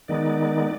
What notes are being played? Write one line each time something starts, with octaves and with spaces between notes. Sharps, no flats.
D#3 G#3 B3 D#4 D5